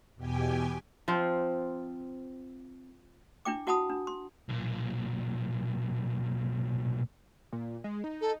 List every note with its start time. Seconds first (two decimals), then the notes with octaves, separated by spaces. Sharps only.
0.16 E2 B2 G4 G5 G#5
1.08 F3 C4 F4
3.45 D4 E4 G5 D6
3.67 E4 F#4 F#5 A5 B5 D#6
3.90 D4
4.07 C6
4.49 B1 A#2
7.53 A#2
7.84 G#3
8.04 D#4
8.21 A4